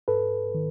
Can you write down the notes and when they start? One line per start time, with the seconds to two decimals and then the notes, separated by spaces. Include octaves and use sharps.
0.08 G#2 A4 B4
0.55 D#3